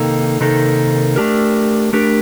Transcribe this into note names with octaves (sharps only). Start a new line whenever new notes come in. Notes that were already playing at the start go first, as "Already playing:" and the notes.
Already playing: C3 D#3 A#3 D#4 A4
C3 D#3 A#3 D#4 A4
A3 D4 G4 A#4
A3 D4 G4 A#4